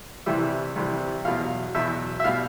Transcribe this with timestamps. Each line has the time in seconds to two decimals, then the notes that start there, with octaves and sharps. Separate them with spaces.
0.26 C2 C3 E3 G3 E5
0.76 C2 C3 E3 G3
1.25 E2 B2 F#3 F5
1.75 E2 B2 F#3 E5
2.20 E5
2.24 B2 G3 F5